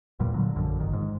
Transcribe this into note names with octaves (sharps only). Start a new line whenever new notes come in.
E1 E2 A#2 G3
A#2 D3 F#3
A#1 F#2 D3 F3
G1 D#3
G#2